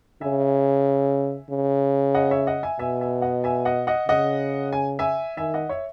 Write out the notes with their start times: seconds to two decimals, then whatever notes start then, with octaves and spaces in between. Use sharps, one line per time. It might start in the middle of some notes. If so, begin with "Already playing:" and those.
0.21 C#3 E5 G#5
1.51 C#3
2.15 D#5 F#5
2.31 C#5 E5
2.47 D#5 F#5
2.63 E5 G#5
2.79 B2 E5 G#5
3.01 E5 G#5
3.22 D#5 F#5
3.44 E5 G#5
3.65 D#5 F#5
3.87 D#5 F#5
4.08 C#3 D#5 F#5
4.73 G#5
4.99 E5 G#5
5.37 D#3 E5 G#5
5.54 D#5 F#5
5.69 C#5 E5